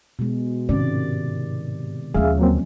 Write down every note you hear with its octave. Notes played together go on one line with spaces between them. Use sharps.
B2 G#3
G#2 C3 D#3 C#4 D5
D#2 D3 F3 G#3 C#4 G#4 E5 F5
F#3 A#3 C4